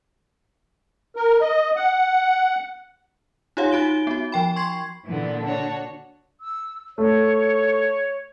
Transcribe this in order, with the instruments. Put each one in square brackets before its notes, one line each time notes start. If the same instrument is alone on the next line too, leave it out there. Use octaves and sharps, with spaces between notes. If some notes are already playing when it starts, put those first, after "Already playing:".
[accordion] A#4
D#5
F#5
[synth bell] D#4 F4 G4 C#5 F5 F#5
D#4 F#4 D7 G7
B3 F#4
F3 G5 B5
C6 C#6 G#6 C7
[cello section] A#2 D3 [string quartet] E3 B3
[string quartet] D4 F#4 C#5 [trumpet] A5
[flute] E6
[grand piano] A3 [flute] C#5